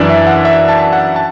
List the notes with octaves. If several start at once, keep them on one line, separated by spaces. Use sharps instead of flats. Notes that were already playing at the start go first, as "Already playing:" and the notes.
Already playing: F#2 E3 D4 D5
E5
F#5
E5
A5
F#5
A5